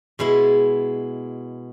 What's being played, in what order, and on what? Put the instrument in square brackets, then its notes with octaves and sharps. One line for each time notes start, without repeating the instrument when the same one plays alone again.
[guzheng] B2 G#3 B3 E4